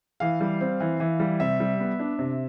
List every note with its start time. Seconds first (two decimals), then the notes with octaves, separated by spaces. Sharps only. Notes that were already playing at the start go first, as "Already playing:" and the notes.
0.20 E3 F5
0.40 G3
0.61 C4
0.80 E3
1.00 E3
1.20 G3
1.40 C3 E5
1.60 G3
1.80 B3
1.99 D4
2.19 C3